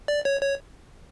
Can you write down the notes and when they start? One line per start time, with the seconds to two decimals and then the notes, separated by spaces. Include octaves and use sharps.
0.08 D5
0.25 C#5
0.42 C#5